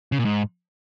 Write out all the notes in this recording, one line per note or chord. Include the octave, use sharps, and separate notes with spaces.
C#3
A#2
G#2